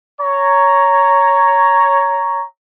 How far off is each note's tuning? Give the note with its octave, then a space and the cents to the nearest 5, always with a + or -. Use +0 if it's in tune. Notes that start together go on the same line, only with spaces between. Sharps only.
C#5 +5 A#5 +0